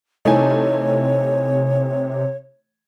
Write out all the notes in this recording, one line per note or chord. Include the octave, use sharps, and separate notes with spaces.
C3 E3 A3 D#4 C#5 G#5